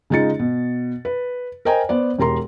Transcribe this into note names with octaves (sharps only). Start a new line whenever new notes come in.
C#3 G#3 D#4 F4 A6 C#7
B2
B4
A#4 C5 D#5 G5 G#5 A#5
B3 C5 D5
E1 G4 A#4 A#5 C6